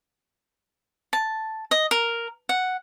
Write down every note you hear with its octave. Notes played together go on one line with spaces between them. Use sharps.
A5
D#5
A#4
F#5